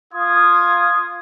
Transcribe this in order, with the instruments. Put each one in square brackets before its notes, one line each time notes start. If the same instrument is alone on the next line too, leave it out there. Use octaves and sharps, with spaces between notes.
[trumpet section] F4 D#6 [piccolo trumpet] G#6